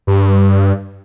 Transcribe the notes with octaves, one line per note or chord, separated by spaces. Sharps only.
G2